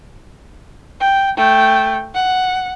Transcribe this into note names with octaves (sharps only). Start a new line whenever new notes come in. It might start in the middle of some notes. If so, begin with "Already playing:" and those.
G5
A3 G5
F#5